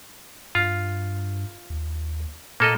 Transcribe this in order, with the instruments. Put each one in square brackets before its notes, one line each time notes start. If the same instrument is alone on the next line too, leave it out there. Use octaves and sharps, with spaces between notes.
[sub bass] G2 [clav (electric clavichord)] F4
[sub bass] D#2
[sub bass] A#2 [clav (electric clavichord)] A#3 A4 D#5